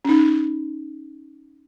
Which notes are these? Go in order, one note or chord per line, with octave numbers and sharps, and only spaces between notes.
C#4 D#4